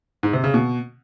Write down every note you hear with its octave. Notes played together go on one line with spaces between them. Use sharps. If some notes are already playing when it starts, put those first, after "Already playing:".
G#2
C3
C#3
B2